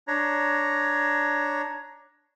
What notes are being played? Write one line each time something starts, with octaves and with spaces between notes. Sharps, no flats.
D4 C#5 A#5